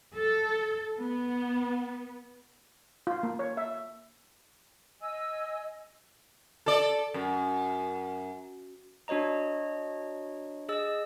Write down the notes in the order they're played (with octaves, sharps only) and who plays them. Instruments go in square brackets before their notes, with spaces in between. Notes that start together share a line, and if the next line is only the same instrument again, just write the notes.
[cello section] A4
B3
[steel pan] F4
A#3
C#5
E5
[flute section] D#5 G#5 E6
[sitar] A4 D5
F#2
[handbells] D4 F#4 C#5 D#5 A#5
G#4 D#5 E6